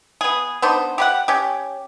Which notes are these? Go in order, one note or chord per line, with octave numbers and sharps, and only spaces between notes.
B3 G#4
B3 D4 D#4 C5
G4 B4 F#5
C#4 G4